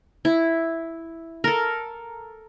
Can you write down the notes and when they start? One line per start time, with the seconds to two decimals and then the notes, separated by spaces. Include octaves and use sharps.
0.25 E4
1.44 A4 A#4